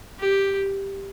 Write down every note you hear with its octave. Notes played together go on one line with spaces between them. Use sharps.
G4